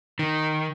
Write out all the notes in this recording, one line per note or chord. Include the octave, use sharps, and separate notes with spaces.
D#3